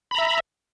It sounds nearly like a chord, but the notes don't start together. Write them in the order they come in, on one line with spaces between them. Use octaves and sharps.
B5 A#5 E5